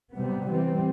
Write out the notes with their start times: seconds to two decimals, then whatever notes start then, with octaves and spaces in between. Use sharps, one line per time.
0.17 C3 G3 B3
0.49 E3 G3 C4